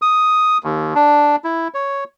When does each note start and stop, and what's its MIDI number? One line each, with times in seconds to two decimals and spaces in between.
0.02 0.58 87
0.64 0.94 39
0.95 1.36 62
1.44 1.68 64
1.74 2.04 73